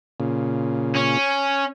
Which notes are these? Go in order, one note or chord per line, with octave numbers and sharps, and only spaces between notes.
A#2 C#3
C#4